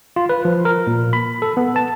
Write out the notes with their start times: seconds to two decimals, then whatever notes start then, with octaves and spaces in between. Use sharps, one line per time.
0.16 F4
0.29 B4
0.45 F3
0.65 A#4
0.87 A#2
1.13 B5
1.42 A4
1.57 B3
1.76 A5